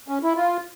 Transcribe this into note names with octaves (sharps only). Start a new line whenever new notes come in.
C#4
E4
F4